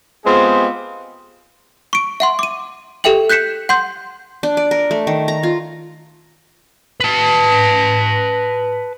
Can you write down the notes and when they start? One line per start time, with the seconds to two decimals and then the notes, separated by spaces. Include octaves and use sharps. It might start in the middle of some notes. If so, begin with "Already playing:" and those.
0.25 G#3 B3 C4 F4 G4 G#4
1.93 C#6 D7
2.20 E5 F#5 C6
2.39 D6 D#7
3.04 G4 A4 E5 G5 F#7
3.29 F#6 G6 B6 C#7 E7
3.69 F#5 C6 G6
4.43 D4
4.57 D5
4.71 A#4
4.91 A3
5.07 D#3
5.28 A#5
5.43 F4
7.00 B4 A5